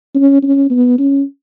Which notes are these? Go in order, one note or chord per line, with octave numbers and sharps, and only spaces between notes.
C#4
C#4
B3
C#4